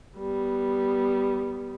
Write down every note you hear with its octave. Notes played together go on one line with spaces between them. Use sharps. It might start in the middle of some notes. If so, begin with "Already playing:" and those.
G3 B3